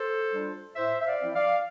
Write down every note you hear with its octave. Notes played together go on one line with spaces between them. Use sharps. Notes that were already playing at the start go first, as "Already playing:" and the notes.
Already playing: A4 C5
G3 D4 F4
A2 C5 E5
E5
D5 F5
F3 C4 E4
D5 F5